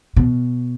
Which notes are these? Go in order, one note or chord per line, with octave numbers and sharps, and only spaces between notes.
B2